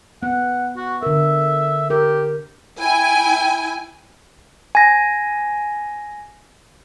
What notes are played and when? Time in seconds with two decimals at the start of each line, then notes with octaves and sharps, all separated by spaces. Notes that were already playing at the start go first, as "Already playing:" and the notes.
0.23 B3 F#5
0.77 F#4
1.03 D3 A#4 E5
1.90 G4 A#4
2.81 E4 G5 G#5
4.75 G#5 A#6